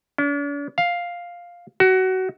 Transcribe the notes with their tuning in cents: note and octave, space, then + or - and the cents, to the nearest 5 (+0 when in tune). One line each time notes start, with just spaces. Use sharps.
D4 -45
F5 +5
F#4 +20